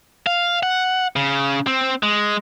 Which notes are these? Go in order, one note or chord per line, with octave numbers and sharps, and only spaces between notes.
F5
F#5
C#3
C4
G#3